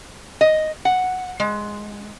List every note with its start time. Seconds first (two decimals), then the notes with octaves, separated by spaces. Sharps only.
0.41 D#5
0.85 F#5
1.40 G#3